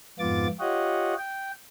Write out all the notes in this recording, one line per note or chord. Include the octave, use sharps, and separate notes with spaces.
F2 G#2 B3 F4 D6 A6
F4 G4 C#5 D#5 F#5
G5